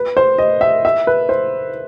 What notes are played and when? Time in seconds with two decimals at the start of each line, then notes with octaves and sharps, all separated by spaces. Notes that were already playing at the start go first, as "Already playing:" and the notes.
Already playing: B4
0.17 C5
0.38 D#5
0.61 E5
0.85 E5
1.07 B4
1.29 C5